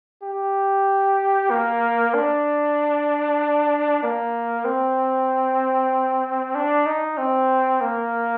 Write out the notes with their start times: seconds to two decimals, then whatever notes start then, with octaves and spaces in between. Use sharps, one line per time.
0.23 G4
1.50 A#3
2.14 D4
4.03 A#3
4.65 C4
6.55 D4
6.86 D#4
7.18 C4
7.81 A#3